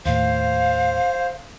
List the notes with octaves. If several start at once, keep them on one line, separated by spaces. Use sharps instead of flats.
D#2 A2 C5 F5